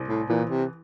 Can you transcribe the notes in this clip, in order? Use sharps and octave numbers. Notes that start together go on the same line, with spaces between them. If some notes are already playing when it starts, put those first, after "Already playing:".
Already playing: C2
A2
A#2 E3
C3